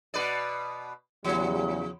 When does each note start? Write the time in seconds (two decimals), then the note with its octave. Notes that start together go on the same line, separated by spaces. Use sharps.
0.14 B2 B4 D5
1.24 E2 C#3 F3 G3